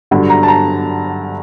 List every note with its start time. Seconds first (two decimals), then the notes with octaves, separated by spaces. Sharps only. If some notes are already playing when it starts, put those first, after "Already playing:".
0.11 G2 D3 F#3
0.30 A#5
0.43 A5
0.48 A#5